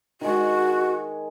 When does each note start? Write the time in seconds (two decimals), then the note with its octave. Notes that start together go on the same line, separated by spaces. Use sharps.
0.21 D#3 G#3 F#4